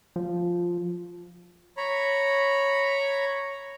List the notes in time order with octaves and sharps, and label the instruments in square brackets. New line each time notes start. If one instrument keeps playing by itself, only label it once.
[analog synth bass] F3
[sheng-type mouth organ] C#5 A#5 B5